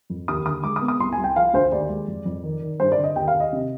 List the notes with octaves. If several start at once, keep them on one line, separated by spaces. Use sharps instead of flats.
F2
D#2 D#6
D3 D#6
G#3 D6
D#6
B3
D#6
C2 C6
G#5
C2
G5
F3 F5
D2 C5
D#2 D5
G#3
F2
F2
D#3
D#3
G2 C5
D5
D3
D#5
D#2 G5
F5
D#2
D#5
C3